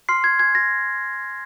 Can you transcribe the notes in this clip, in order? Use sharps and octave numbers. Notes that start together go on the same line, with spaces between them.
C6 F6 C7
G#6
G#5 G#6
A#6